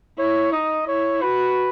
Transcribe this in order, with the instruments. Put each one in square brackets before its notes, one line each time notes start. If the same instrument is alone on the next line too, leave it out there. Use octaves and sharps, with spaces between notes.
[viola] E4 [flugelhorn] C#5
[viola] D#4 [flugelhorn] D#5
[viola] E4 [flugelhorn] C#5
[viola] F#4 [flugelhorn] B4